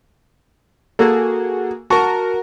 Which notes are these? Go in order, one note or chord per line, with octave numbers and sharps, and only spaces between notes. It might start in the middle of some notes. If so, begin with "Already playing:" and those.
A#3 F#4 G#4 A4
F#4 A#4 A5 C#6